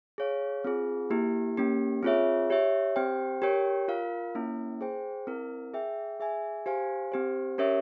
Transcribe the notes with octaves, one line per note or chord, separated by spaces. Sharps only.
G#4 C#5 F5
C4 F4 G#4
A#3 E4 G4
A#3 C#4 G4
C4 F4 G#4 C#5 E5
G4 C#5 E5
C4 G4 C5 G5
G4 A#4 C#5 G5
F4 A#4 F5
A#3 C#4 E4
G#4 C5 G5
C4 E4 A#4
G#4 E5 G5
G#4 E5 G#5
G4 C5 F5 G#5
C4 G4 C5
C#4 G4 A#4 C#5 E5